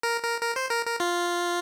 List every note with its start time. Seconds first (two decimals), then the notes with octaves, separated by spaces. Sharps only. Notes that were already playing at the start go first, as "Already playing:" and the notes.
0.03 A#4
0.23 A#4
0.42 A#4
0.56 C5
0.71 A#4
0.86 A#4
1.00 F4